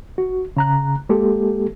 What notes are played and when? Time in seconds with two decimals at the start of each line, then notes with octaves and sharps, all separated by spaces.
0.18 F#4
0.57 C#3 A#5 F#6
1.09 G#3 A#3 G4 A4